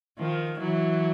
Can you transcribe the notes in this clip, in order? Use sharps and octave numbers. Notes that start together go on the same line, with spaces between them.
D#3 F3
E3 F#3